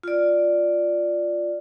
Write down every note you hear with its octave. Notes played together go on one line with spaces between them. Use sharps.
F4 D5